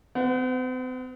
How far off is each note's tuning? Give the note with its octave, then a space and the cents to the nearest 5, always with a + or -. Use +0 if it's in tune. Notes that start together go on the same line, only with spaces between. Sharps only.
C4 -45 F#5 +0